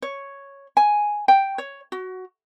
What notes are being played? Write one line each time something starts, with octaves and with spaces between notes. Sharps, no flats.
C#5
G#5
G5
C#5
F#4